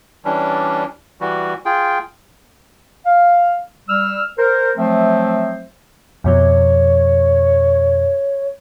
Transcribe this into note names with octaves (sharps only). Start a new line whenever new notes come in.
E3 G3 C#4 D4
E3 G3 F#4
F4 G#4 G5
F5
G3 E6 F6
A#4 C5
F3 F#3 A3 C4 C5 E5
F2 B2 F3 C#5